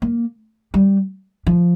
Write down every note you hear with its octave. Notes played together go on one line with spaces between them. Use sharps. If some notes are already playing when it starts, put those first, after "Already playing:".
A#3
G3
F3